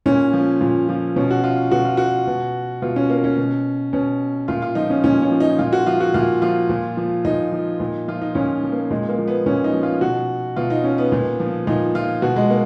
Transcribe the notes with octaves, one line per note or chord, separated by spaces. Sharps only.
A#2 C#4
F3
A#2
F3
B2 C#4
F#4
F4
B2 F#4
F4
F#4
B2
B2 F4
C#4
A#3
C#4
B2
B2 C#4
A#2 F4
F4
F3 D#4
C#4
A#2 C#4
C#4
F3
D#4
A#2 F4
F#4
F3 F4
F#4
A#2 F4
F3 F4
A#2
F3
A#2 D#4
F3
A#2
F3 F4
D#4
A#2 C#4
F3
A#3
A#2 G#3
A#3
F3
B3
A#2 C#4
D#4
F3
F4
B2 F#4
B2 F4
D#4
C#4
B3
A#2
F3
A#2 D#4
F3 F4
B2 F#4
G#3
A#3